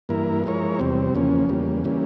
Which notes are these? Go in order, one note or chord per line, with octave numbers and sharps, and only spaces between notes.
G2 E3 A#3 E4 A#4
F3 G#3 E4 A#4 C#5
E2 C3 G3 C4
E2 C#3 F3 A#3 C#4
E2 C#3 G3 A#3
E3 G3 A#3 C#4